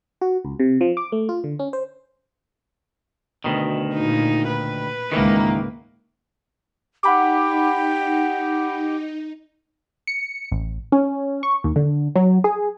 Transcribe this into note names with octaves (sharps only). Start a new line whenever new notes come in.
F#4
C#2
C3
F3
D6
A3
F4
D3
C#4
C5
D2 B2 D#3
A#2 D#4
B4
C#2 G#2 D#3 E3 A#3
D#4 G4 F#5 B5 D6
C#7
A1
C#4
C#6
D#2
D3
F#3
G#4